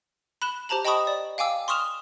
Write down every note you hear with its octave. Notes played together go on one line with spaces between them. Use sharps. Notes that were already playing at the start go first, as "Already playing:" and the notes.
B5 F#6 E7 G7
G4 C5 A5 A#5 F#7
D#5 G5 A5 B5 C#6 D#6
D5
F5 G5 G#5 D6 E6
C6 C#6 D#6 F6 E7 F7